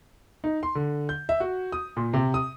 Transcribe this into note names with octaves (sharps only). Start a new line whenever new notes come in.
D#4
C6
D3
G6
E5
F#4
D#6
A#2
C3
D#6